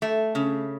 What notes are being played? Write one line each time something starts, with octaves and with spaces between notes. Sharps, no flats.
A3
C#3